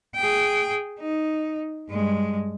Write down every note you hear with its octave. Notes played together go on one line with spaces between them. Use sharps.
G#4 G5
D#4
G2 G#3